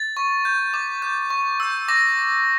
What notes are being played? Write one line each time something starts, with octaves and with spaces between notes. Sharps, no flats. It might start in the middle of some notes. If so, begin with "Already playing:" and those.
Already playing: A6
C#6
G6
D6
G6
C#6
E6 G6
D6 A#6